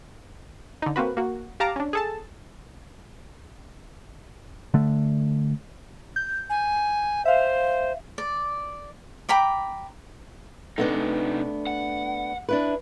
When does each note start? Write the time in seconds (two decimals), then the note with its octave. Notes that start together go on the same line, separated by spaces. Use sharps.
0.82 D3 D#4
0.96 A#3 C4 F#4 B4
1.17 A#3 F#4
1.60 G4 F5 A5 A#5 D6
1.76 C#4 D4
1.93 G#4 A4 A5
4.74 D3 A3
6.16 G6
6.50 G#5
7.25 C5 E5 F5
8.18 D5
9.29 G5 A#5 B5 D6
10.78 C3 A3 B3 D4 D#4
11.67 F#5
12.49 D4 E4 B4